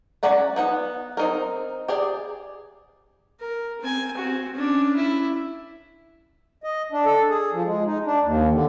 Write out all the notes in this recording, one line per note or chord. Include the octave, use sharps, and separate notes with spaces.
C#4 F#4 D5 F#5 A#5
B3 D#4 F#5
C4 D#4 A#4
G4 G#4 D5
A#4
C4 G#5
C4 F#4
C#4 D4
E4
D#5
D4
A4
G#4
F3
G#3
D#4
D4
D#2
D3